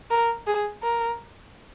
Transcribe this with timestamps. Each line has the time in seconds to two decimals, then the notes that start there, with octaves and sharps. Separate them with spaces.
0.11 A#4
0.47 G#4
0.83 A#4